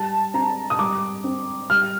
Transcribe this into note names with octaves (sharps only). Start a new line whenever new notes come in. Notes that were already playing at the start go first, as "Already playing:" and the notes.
Already playing: G3 A5
C4 A#5
D#6
G3 D6
C4
G3 F6